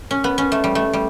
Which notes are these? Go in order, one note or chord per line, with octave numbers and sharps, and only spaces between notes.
C#4
B3
C#4
A3
G3
A3
G3